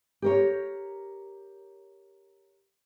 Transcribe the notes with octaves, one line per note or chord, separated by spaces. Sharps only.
G4 A#4 C#5